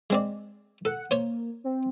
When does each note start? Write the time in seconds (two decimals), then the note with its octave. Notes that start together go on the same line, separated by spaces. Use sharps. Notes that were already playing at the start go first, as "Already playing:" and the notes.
0.10 G#3 C4 D5
0.85 A4 F#5
1.11 A#3 C5 C#5
1.64 C4